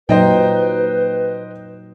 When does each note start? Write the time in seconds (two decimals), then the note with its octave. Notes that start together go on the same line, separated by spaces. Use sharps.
0.09 A#2 F#3 D#4 B4 C5 D#5 G5